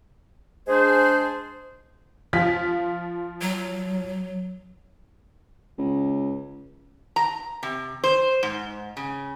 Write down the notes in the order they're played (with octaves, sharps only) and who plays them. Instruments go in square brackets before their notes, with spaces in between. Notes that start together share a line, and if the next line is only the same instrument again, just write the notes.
[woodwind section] G#3 D4 G#4 C5
[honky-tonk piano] F3 F4 B6
[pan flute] F#3
[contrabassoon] C#2
[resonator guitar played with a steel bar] A#5
C3
C5
G#2
C#3